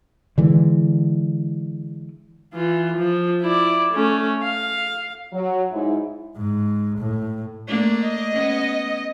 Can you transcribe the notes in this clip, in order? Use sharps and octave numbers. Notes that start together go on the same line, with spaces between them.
D3 E3 G#3
E3 F4
F3
E4 D5
A3 C#4
F5
F#3
G#2 E4
G#2
A2
A3 A#3 D4
D#5
B3 C#4